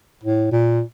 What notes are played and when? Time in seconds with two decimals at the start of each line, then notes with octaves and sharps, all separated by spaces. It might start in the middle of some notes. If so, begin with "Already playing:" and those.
0.24 A2
0.52 A#2